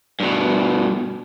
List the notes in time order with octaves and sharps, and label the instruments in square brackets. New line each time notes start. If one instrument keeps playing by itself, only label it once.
[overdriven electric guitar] G2 B2